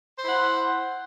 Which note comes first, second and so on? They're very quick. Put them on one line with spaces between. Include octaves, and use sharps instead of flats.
C5 E4 F#5